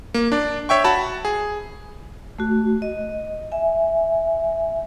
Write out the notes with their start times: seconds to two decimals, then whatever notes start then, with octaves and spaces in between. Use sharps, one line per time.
0.14 A#3
0.32 D4 D5
0.69 C#5 E5 G5 C#6
0.84 F#4 A5 B5
1.25 G#4
2.38 A3 F#4
2.82 D#5
3.52 E5 G#5